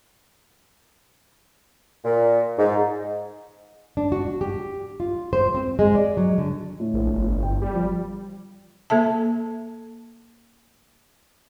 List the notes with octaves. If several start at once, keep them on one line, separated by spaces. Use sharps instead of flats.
A#2
G#2
D4
F#4
G4
F4
C5
C4
G#3
D5
F#3
D3
A2
A#1
G1
G5
G3
F3
A#3 A4 E5 A5